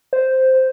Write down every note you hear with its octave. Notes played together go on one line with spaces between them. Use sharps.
C5